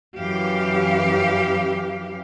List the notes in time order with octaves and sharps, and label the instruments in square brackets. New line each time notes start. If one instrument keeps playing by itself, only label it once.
[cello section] F#2 E3 G4 F5